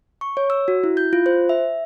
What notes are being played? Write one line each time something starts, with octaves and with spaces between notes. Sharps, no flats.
C#6
C#5
E6
F#4
E4
G6
F4
C5
E5